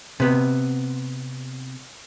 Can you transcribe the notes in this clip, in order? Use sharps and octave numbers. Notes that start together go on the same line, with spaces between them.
C3 B3